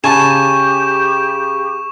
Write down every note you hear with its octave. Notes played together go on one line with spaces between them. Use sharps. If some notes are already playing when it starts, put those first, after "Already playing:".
C#3 G4 G#5 A5 C#6 E7